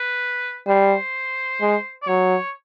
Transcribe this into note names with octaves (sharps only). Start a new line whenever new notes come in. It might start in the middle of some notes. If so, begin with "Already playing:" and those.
Already playing: B4
G3 C5
G#3
D5
F#3 C#5